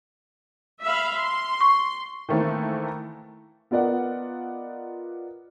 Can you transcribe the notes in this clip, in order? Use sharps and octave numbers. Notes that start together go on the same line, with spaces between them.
E5 F5 B5
C6
C#6
D#3 E3 A3 A#3 C4 E4
B3 F4 A#4 D5 D#5 F#5